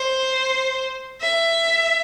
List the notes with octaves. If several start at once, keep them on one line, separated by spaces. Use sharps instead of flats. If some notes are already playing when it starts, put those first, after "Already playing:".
Already playing: C5
E5